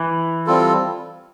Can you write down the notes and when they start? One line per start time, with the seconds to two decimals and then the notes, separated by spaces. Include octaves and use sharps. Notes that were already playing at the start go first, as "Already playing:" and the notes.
Already playing: E3
0.47 G3 C4 F4 A4